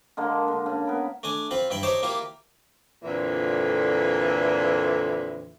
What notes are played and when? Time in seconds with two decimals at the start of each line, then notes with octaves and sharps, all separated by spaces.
0.17 D3 G#3 A#3
0.48 D3
0.66 C#3
0.86 B3 A#4 B5
1.23 A3 D4 G#5
1.51 C4 F4 B5
1.70 G2 E4 G5 B5
1.83 D#4 G4 C5 C#5 G5 A5
2.02 A#3 E4 F4 G4
3.04 F2 A#2 D3 E3